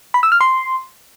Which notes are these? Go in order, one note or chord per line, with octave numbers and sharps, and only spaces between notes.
B5
E6
F6
C6